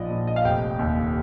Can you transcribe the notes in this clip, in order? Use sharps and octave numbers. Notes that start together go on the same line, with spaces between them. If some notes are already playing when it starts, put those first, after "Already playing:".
Already playing: A#1 G#2 F3 D5 D#5
A#1
D#5
F5
F1 G5
D#2